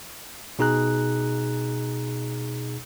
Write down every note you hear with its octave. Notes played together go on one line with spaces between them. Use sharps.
B2 D#4 G#4 A#5 F#6